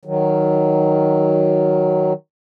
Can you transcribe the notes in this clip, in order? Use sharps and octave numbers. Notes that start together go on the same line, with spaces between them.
D#3 F#3